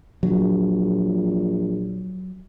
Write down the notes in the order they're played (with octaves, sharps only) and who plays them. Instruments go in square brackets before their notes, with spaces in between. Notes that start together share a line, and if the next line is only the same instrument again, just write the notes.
[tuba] A#1 [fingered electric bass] F#3